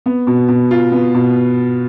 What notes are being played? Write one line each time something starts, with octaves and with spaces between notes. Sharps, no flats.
B3
B2
B2
F4
B3
B2